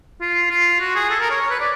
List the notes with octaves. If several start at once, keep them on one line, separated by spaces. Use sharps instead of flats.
F4
F4
F#4
G#4
A4
A#4
C#5
C#5
B4
D5